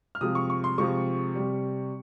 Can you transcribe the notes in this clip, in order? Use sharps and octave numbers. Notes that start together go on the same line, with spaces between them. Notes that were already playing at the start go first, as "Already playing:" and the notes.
F6
C3 F3 G#3 D#6
C#6
C#6
C6
C3 F3 G#3 C#6
C3 G3